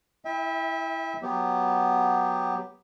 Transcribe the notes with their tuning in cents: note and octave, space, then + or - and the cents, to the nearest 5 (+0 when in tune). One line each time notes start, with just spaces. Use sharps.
E4 +0 E5 -30 G5 +30
F#3 +0 B3 +0 G4 +0